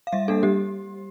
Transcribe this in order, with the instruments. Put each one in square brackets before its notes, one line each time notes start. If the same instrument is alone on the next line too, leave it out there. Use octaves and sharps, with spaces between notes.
[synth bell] F5
G3 E5
A#3 D4 A4
G3 G4